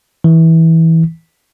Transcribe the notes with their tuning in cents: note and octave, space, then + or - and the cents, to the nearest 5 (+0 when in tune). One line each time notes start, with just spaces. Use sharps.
E3 -20